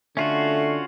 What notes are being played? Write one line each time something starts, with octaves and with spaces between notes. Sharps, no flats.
D3 A3 C#4 F4 F#4